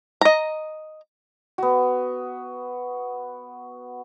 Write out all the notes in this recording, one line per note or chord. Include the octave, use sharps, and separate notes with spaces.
D#5 A#5
B3 F#4